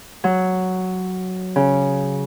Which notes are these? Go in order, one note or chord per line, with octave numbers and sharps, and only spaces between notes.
F#3
C#3